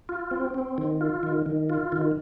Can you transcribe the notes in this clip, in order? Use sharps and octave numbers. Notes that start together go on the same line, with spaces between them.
F4
C4
C4
D#3
F4
D#3
D#3
F4
D#3